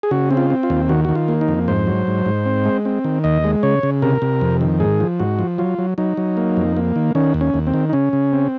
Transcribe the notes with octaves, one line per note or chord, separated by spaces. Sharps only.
G#4
C#3 F#4
C4
F4
C4
F4
D#2
D#3 F#4
D#3 F#4
F4
A#3
D#4
F2
G#2 C5
F#3
G#2
G#2
C4
G#3
C4
D#3
D#2 D#5
G#3
C#3 C#5
C#3
C3 A#4
C3
F2
D#3
G#2 G#4
F3
G#2 F#4
F3
F#3 F4
F#3
F#3 D#4
F#3
A#3
F2
A#3
D#3
D#3 C#4
D#2
C#4
D#2
C4
D#3
D#4
C#3 C#4
C#3
C4